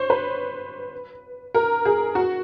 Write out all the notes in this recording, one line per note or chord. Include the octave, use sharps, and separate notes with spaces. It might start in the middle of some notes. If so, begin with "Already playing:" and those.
Already playing: C5 C#5
B4
A#4
G#4
F#4